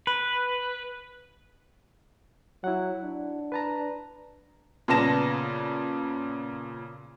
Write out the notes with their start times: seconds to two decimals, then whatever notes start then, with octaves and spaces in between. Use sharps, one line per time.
0.07 B4
2.64 F#3 E4 F#5
3.03 D4
3.52 B4 A5 A#5
4.88 A#2 C#3 B3 A5 A#6 E7